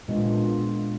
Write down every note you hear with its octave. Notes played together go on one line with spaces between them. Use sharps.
A#2 G#3 B3 D4 F4